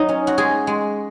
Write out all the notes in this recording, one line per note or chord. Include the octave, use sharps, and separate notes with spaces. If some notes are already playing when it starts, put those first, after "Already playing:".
Already playing: F#3 D#4
C#4
F#4
G#3 G#4
G#3